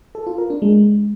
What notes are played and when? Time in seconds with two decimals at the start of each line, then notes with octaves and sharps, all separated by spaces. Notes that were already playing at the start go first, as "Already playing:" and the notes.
0.15 A4
0.27 F4
0.38 A#4
0.50 D4
0.62 G#3